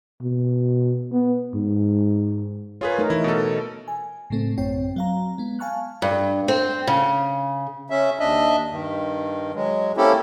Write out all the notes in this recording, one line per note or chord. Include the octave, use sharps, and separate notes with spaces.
B2
B3
G#2
F4 G#4 A#4 B4 C#5
A3 D#4 A#4
E3 D#4 E4
B2 A4 A#4
G#5
A2 C#3 A3 C4
A1 F#2 C4 C#5 G5
F#3 F5 A#5
G#3 B3
F5 G#5 A5 C#6 F6 F#6
G2
C4
C#3
C#3 C#4 E5
D#2 D4 D#5 E5
G2 D#3
F#3 G#3
A#3 C4 C#4 E4 G4 A4